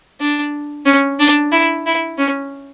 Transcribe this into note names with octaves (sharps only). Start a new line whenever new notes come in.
D4
C#4
D4
E4
E4
C#4